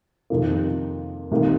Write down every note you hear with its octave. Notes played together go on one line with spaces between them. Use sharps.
F2 C3 D#3 A#3
C2 C3 D#3 A#3